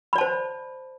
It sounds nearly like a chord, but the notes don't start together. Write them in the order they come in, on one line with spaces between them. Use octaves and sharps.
B5 D5 A5 C5